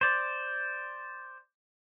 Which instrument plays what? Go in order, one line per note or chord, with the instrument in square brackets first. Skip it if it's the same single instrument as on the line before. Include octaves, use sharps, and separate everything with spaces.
[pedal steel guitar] C5 D5